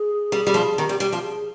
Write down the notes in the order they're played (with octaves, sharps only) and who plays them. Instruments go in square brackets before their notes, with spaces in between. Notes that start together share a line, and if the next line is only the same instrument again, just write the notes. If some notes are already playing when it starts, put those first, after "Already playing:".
Already playing: [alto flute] G#4
[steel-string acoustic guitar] G3
G3
F3
[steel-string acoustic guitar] D#3 [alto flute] G4
[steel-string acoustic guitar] G3
[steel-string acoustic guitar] G3 [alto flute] G4
[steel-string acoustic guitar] F3
[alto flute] G#4